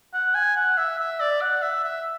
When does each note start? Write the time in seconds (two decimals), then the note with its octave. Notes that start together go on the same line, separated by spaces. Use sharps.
0.14 F#5
0.34 G#5
0.56 F#5
0.77 E5
0.99 E5
1.20 D5
1.41 F#5
1.62 E5
1.84 E5